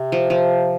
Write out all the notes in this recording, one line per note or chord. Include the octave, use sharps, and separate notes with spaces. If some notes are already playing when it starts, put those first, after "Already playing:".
Already playing: C3
F3
F3